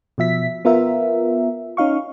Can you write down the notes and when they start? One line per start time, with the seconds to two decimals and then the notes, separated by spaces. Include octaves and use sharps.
0.18 B2 F3 E5 B6
0.65 B3 F4 A#4 E5
1.77 C#4 D#4 F5 C#6